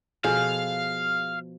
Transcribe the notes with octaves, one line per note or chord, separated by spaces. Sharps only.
B2 F3 G#4 A4 F5